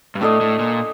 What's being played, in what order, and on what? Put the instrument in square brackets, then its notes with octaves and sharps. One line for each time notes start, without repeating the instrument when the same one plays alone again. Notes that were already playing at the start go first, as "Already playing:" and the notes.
[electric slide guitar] G2
[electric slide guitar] A2 [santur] D4 A4 D#5
[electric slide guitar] A2
A#2